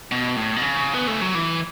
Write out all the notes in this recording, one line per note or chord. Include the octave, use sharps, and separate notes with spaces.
B2
A2
B2
C#3
B3
A3
F#3
E3